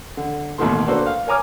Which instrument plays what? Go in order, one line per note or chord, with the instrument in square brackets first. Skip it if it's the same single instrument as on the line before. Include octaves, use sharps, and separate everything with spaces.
[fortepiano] D3
A1 D#2 B2 D#3 A3 C6
A#3 D4 F#4 A4 B4 C5
F5
A#4 C#5 G#5 A#5 D6 F6